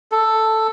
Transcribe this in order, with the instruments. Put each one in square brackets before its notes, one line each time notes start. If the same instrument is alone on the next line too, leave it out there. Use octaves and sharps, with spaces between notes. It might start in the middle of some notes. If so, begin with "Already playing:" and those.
[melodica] A4